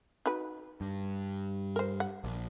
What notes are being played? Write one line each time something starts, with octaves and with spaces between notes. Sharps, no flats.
D#4 F#4 B4
G2
A#4 C5
F#5
A#1